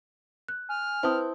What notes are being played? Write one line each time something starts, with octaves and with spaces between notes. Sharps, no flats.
F#6
G#5 F6
C4 E4 B4 C5 A5 D#6